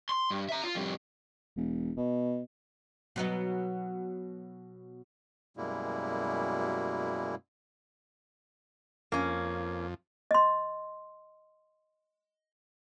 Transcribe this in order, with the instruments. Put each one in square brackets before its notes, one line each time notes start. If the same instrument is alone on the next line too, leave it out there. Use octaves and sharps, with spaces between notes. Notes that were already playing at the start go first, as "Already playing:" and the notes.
[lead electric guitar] C6
G2
E5 A#5
F4
F2 G3
[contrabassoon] E1
B2
[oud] B2 F#3 D#4
[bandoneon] F#2 B2 G3 G#3 A#3 E4
[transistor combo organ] F2 [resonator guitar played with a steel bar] A#3 C#4
[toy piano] D#5 C6